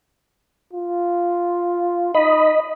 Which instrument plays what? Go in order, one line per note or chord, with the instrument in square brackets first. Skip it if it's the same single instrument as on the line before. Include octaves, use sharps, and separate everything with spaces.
[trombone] F4
[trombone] D#4 [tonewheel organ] D#5 B5